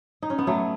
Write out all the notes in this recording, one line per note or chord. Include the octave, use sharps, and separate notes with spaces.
D#4
C#4
B3
F#3 A3